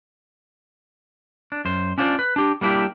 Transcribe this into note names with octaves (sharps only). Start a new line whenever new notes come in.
D4
F#2 C5
C#4 D4 F4 C5 D5
B4
D4 G4
G3 A#3 D4 E4 G4